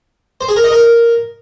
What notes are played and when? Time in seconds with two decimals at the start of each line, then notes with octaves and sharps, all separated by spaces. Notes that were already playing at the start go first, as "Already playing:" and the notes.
0.41 C5
0.49 G#4
0.56 A#4
0.64 D#5
0.72 A#4